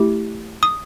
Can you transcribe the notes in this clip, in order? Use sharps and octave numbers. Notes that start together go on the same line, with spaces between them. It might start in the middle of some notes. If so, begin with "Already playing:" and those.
Already playing: A3 E4 G4
D#6